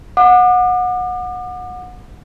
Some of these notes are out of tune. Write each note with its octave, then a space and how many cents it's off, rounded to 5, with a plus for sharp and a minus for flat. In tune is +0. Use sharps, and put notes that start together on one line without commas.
F#5 -25 D6 +40